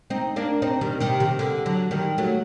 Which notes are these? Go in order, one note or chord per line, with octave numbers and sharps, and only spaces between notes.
C4 D#4
A#3 D4
C4 D#4
D#3 G3
C3 D#3
C3 D#3
D3
D3 F#3
D#3 G3
F#3 A3